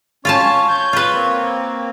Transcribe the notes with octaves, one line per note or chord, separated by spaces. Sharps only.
C#4 F4 C#5 F5 A5
C#5 G6
F4 B4
A#3 C4